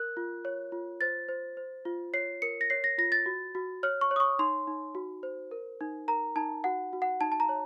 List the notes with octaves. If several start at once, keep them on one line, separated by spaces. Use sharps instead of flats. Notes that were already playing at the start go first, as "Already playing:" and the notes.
Already playing: A#4 F#6
F4
C#5
F4
C5 A6
C5
C5
F4
C#5 C7
A#4 C#7
A#6
C#5 C7
A#6
F4 A#6
A6
F#4
F#4
C#5 F6
C#6
C#5
D#6
C#6
D#4 C6
D#4
F#4
C5
A#4
D#4
A#4 A#5
D#4 A5
F#4 F#5
F#4
F#5
D#4 A5
A5
A#5
C#5